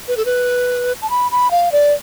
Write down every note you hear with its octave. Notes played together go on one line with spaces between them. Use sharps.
B4
A4
B4
A5
B5
B5
F5
D5